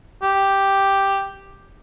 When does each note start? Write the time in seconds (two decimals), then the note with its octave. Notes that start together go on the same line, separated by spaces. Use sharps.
0.22 G4